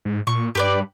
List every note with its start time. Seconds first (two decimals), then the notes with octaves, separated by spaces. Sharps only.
0.05 G#2
0.27 A#2 C#6
0.55 G2 G4 B4 D5